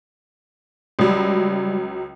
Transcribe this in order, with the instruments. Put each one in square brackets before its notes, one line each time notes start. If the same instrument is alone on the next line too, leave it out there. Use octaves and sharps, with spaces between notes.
[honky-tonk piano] C#2 F#3 [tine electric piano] G3